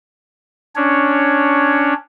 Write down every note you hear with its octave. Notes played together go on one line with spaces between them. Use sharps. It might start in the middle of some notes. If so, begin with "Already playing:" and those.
C#4 D4 C#5